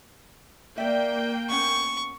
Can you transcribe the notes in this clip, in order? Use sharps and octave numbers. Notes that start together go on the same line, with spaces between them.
A#3 D5 E5 G5
B3 C#4 C#6